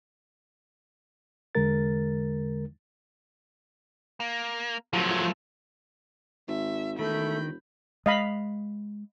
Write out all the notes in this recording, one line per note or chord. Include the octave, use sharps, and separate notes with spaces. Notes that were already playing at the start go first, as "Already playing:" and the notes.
E2 D3 G#3 A#4 A6
A#3
F3 F#3 A3 A#3
G#1 E5
E1 D#3 A3 B5 G6
G#3 D#5 F5 B5